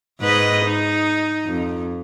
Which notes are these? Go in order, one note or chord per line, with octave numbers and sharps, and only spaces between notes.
G#2 B4 D#5
D#4
F2